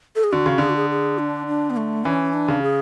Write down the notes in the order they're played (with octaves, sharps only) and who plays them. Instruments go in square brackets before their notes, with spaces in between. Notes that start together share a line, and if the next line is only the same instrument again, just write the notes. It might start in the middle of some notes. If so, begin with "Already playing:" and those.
[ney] A4
G#4
[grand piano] D3 [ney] F#4
[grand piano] C#3
[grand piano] D3 [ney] G#4
[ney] F#4
G#4
G#4
D4
D4
B3
A3
[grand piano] E3 [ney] C#4
[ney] D4
[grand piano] C#3
[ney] G#4